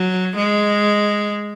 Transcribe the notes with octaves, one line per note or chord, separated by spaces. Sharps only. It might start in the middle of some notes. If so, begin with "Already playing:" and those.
Already playing: F#3
G#3